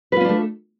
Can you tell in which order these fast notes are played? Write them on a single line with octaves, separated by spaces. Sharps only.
B4 F4 C#4 D4 A3